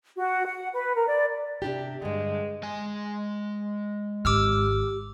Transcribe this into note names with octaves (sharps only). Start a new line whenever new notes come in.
F#4
F#5
B4
A#4
D5
C3 D4 G4
G2 D3 G#3
G#3 G#5
G#1 G4 D6 E6 F6